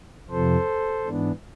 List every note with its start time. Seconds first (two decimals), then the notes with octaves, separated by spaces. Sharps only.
0.30 F2 C3 F3 A4 C5
1.05 G#2 E3 B3 D4